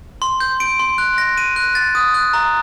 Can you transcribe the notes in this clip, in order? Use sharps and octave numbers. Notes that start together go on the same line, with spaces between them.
C6
G6
D7
C6
F#6
A#6
D#7
F#6
A6
D#6
F#6
A#5